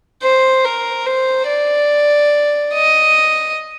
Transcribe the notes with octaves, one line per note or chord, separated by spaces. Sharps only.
C5
A#4
C5
D5
D#5